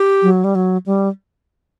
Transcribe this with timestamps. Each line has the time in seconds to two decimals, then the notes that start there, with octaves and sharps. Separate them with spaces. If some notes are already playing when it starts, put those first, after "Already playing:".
Already playing: G4
0.23 F#3
0.44 G3
0.55 F#3
0.86 G3